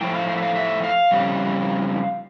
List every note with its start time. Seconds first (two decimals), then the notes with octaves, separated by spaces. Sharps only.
0.01 A2 F3 A3 G5
0.15 F5
0.28 F5
0.37 E5
0.43 F5
0.55 E5
0.83 F5
1.11 F2 C#3 G3